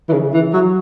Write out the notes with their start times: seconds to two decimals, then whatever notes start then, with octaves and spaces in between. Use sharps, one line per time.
0.09 E3
0.13 C#3
0.34 E3
0.54 F#3